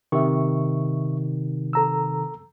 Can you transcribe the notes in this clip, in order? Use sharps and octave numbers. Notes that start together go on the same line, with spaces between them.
C3 D#3 E5 C#6
A4 A#5 E6